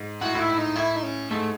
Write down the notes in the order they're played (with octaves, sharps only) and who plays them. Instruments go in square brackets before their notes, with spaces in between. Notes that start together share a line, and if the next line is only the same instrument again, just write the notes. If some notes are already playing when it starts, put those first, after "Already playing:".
Already playing: [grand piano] G#2
[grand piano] A2 [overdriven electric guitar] F#4
[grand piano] A2
[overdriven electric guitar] E4
[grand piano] A2
[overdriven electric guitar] D#4
[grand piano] A2 [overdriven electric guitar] E4
[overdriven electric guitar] D#4
C#4
[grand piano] G#2 [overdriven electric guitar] A3